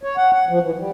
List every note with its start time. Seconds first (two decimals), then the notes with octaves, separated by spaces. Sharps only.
0.03 C#5
0.17 F#5
0.33 F#5
0.49 F3
0.62 E3
0.77 G3